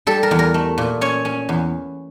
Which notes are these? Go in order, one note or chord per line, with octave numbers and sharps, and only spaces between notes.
G3 A4
A#4
E2
A#4
A3
A#2
C#4 C#5
C#4
E2